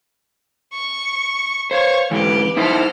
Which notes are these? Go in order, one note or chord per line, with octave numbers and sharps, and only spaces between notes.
C#6
C5 C#5 F5 C#6
G#2 E3 G4 B4
D#4 E4 A4 C5 F6